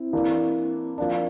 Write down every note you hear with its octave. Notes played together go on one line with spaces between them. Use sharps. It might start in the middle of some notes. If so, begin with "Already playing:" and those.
Already playing: C4 E4
E3 A#3 D4
F3 A#3 D4